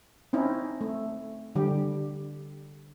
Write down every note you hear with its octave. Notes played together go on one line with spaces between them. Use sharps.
C4 C#4 D#4 E4
A3
D3 G3 G4